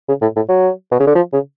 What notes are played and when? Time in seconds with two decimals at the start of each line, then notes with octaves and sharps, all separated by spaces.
0.08 C#3
0.22 A2
0.36 A2
0.49 F#3
0.91 B2
1.00 C#3
1.07 D3
1.15 F3
1.33 C#3